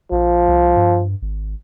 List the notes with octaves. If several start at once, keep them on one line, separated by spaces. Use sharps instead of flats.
A#1 F3
C2
G2
G#1